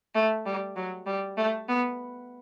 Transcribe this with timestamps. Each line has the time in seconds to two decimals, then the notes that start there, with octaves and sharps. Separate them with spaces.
0.15 A3
0.46 G3
0.76 F#3
1.06 G3
1.37 A3
1.69 B3